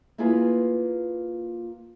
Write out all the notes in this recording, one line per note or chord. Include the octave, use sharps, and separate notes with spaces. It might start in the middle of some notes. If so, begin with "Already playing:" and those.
A#3 E4 F4 G#4 B4